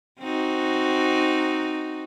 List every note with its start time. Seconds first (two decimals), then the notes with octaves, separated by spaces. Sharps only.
0.21 C4 D#4 F#4